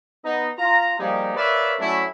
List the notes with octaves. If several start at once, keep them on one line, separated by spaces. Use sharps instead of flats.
B3 D#4 D#5
F4 A#5
F3 G3 A#3 D#4 G4 G#4
A#4 B4 C#5 D5 E5 F5
F#3 A3 C#4 D4 E4